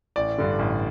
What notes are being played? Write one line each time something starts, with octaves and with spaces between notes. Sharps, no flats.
A1 D5
G2 D3
A1